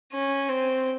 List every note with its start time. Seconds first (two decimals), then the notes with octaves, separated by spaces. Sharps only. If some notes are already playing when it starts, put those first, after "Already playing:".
0.13 C#4
0.49 C4